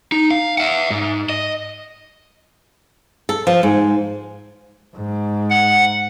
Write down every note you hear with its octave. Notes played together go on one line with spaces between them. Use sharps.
D#4
F5
E5 F#5
G#2
D#5
A4
F3
G#2
G#2
F#5